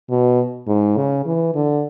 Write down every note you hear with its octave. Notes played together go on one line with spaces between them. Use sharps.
B2
G#2
C#3
E3
D3